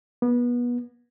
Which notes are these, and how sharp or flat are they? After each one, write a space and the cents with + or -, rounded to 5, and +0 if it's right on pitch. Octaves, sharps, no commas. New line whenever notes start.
B3 -25